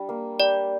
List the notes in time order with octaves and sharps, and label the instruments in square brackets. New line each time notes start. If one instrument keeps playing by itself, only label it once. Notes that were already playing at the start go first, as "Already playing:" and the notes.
Already playing: [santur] G3 D4
A#3
[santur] G3 [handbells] D5